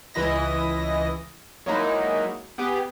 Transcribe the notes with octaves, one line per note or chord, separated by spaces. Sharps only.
C#2 E3 E4 D#5 A#6
F#3 G#3 A#3 D#4 E4
B3 G4 G#4